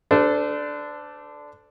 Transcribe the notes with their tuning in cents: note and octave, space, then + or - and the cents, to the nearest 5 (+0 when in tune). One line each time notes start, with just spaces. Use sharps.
D4 +0 A4 +0 C5 -35